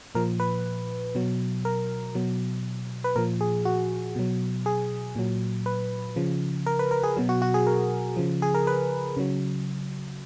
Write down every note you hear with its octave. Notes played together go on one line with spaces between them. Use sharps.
A#2 F3 A#4
B4
B2 F#3
A#4
B2 F#3
B4
A#2 F3 A#4
G#4
F#4
B2 F#3
G#4
A#2 F#3
B4
C#3 F3
A#4
B4
A#4
G#4
B2 F#3
F#4
F#4
G#4
A#4
C#3 F3
G#4
A#4
B4
C#3 F#3